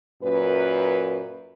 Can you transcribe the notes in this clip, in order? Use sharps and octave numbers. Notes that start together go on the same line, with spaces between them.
F#2 A#2 B4